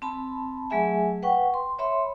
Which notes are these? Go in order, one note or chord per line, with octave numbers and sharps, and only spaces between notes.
C4 A5 B5
F#3 A3 G#4 E5 G#5
B4 F#5 G5 C#6
C6
C#5 E5 B5 C6